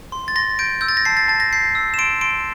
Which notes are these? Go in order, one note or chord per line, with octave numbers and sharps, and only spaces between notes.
C6
A6
C6 A#6
G6 D7
E6 G6
A6
A#6
A5 C7
A6
A5 A6
A#6
G6 C7
E6
E7
C6 D7
C6 D7